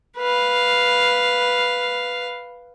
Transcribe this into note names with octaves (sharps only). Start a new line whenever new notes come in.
B4 F5